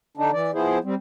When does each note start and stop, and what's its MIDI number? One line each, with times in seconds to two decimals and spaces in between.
0.17 0.31 50
0.17 0.31 62
0.17 0.31 63
0.33 0.51 52
0.33 0.51 74
0.54 0.79 53
0.54 0.79 59
0.54 0.79 64
0.54 0.79 68
0.54 0.79 72
0.84 0.95 55
0.84 0.95 60